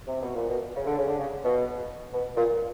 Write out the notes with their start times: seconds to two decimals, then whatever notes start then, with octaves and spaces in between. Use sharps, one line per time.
0.07 C3
0.22 B2
0.35 A#2
0.49 B2
0.76 C#3
0.87 D3
0.98 C#3
1.08 D3
1.19 C#3
1.45 B2
2.13 B2
2.37 A#2